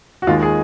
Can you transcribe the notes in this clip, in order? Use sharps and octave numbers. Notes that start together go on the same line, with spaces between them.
F#4
D#2 D#3 G#3 F4
G#4